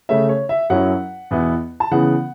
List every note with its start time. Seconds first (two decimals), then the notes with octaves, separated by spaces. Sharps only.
0.09 C#3 A3 C#4 E5
0.29 C#5
0.49 E5
0.70 F#2 F#3 C#4 E4 F#5
1.31 E2 B2 B3 E4
1.80 A5
1.91 C#3 E3 B3 F#5